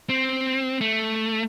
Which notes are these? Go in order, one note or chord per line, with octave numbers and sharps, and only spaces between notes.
C4
A3